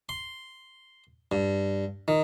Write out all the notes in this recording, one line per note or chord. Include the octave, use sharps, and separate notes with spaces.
C6
G2
D#3